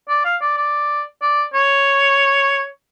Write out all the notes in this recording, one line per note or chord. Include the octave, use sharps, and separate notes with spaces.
D5
F5
D5
D5
D5
C#5